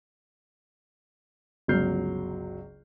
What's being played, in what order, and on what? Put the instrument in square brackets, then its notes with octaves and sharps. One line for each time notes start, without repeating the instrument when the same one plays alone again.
[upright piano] G1 C#2 F#3 F6 G6 C7